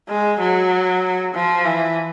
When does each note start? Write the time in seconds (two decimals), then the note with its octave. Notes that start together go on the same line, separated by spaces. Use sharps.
0.08 G#3
0.40 F#3
1.34 F3
1.65 E3